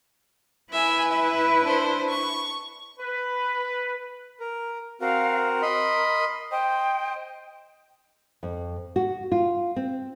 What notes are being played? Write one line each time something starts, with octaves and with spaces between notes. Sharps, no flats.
E4 B4 E5 G#5
E5
D4 C5
C#6
B4
A#4
C4 F#4 A#4 F5
A#4 D#5 B5 C6
C5 D#5 G5
F2
F#4
F4
C4